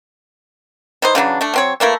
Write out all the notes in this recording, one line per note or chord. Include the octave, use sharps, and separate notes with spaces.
E3 D#4 C5
C#3 E3 F#3 D4
A3 D4
F#3 C4 C#5
E3 A3 A#3 E4